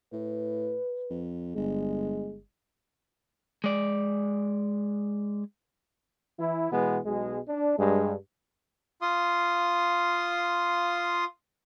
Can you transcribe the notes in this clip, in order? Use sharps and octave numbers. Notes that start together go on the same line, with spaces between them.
A2 B4
F2
G1 G#3
G#3 D5
E3 E4
B2 E3 G#3 B3
B1 B2 G#3
D4
G2 G#3
F4 F5 C6 D#6